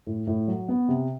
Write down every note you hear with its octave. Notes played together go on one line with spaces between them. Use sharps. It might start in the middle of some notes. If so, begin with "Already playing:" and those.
A2
A2
F#3
B3
C3